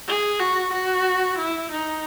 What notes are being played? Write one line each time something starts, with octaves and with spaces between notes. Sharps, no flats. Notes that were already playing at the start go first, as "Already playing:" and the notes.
G#4
F#4
F#4
E4
D#4